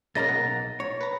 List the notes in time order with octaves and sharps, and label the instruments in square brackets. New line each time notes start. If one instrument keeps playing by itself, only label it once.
[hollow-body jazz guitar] B1 D#5 A#5 [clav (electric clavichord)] C#3 A#3 A#4 [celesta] A6 A#6
[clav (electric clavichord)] F#5
[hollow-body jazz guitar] C#5
[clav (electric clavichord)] B4 A#5